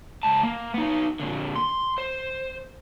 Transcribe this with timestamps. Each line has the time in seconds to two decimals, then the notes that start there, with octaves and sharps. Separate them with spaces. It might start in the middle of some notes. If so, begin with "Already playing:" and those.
0.23 C#2 A5
0.43 A#3
0.74 B3 D#4
1.20 A#2 D3
1.56 C6
1.98 C5